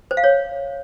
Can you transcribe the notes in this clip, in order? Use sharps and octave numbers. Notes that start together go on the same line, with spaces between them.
C5
F5
C#5